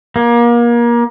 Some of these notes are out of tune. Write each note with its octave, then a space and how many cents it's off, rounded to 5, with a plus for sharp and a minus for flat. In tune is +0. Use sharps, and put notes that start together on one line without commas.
A#3 +30